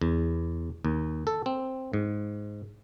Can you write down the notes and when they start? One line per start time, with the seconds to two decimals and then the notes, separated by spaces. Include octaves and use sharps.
0.02 E2
0.85 D#2
1.27 A4
1.46 C4
1.93 G#2